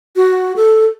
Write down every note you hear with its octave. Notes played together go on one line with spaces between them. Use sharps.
F#4
A4